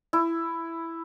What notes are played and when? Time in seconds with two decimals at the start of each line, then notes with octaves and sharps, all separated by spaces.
0.13 E4